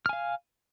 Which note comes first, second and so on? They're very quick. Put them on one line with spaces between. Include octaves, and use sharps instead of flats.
F6 G#5 F5